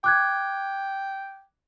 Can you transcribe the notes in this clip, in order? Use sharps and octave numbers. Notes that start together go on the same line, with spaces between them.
G5 D6 F#6 G#6